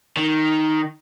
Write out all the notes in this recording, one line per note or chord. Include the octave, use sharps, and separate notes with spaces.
D#3